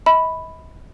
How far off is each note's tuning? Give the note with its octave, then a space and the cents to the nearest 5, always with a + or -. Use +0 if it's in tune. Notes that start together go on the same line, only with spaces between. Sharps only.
D#5 +45 B5 +5